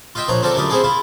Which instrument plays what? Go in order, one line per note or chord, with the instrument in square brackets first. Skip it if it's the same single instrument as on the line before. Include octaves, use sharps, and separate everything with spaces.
[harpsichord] F4 D#5 E5 G5
A#1 F3 C#5 A#5
C4 F4 A4 A#4 D5
F#2 D3 G3 F4 D5 D#6
C4 E4 F4 G#4 A4
E4 F4